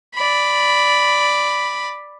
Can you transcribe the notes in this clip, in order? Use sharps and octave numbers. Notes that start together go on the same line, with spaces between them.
D5 B5